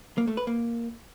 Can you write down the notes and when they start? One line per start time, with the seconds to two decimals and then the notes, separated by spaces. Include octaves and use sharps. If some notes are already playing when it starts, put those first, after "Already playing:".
0.18 A#3
0.27 A3
0.37 B4
0.47 A#3